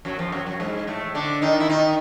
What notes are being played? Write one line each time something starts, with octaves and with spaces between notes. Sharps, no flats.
F#2 F#3
F2 F3
F#2 F#3
F#2 F#3
G#2 G#3
A2 A3
D3 D4
D#3 D#4
E4
D#3 D#4